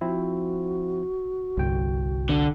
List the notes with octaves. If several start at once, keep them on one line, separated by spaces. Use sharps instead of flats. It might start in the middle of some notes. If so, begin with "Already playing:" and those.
F3 C4 E4 F#4
G1 C2 G5
D3